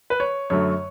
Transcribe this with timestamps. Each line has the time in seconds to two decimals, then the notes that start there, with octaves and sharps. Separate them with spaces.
0.10 B4
0.20 C#5
0.50 F#2 D3 F#3 A3 C#5